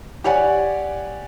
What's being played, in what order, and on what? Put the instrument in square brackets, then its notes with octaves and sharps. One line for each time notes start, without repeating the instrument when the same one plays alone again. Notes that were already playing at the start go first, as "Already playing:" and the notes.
[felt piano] G4 C#5 D5 F#5 G#5